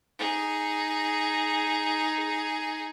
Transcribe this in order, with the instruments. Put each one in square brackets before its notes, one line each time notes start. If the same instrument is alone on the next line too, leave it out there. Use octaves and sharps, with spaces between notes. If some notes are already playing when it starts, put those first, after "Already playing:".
[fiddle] D#4 G#4